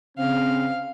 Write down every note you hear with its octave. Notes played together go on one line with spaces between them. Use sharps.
C#3 C4 F5